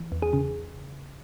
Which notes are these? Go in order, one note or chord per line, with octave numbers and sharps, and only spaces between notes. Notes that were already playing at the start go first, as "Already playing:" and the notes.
Already playing: E3
E2
G#4
C#3